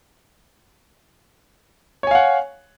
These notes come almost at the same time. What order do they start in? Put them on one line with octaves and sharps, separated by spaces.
C#5 G#5 F5 F#5